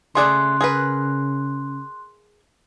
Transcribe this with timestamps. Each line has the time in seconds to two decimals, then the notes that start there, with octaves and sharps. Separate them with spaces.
0.15 C#3 A3 G#4 D5 C6 F#6
0.61 G#4 A#4 B4